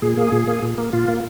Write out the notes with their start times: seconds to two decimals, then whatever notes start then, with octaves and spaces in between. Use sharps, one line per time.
0.02 A#2 G#4
0.17 A#3
0.32 A#2
0.48 A#3
0.62 A#2
0.78 A#3
0.93 A#2 F4
1.08 A#3